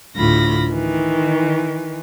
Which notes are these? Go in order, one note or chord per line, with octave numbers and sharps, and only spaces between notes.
D2 A2 F4 B5 A#6
D#3 E3